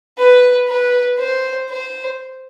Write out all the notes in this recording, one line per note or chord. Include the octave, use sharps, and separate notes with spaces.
B4
B4
C5
C5